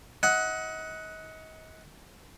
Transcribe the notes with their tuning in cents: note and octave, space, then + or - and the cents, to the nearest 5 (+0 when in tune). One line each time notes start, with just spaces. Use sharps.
D#4 +35 F#5 +0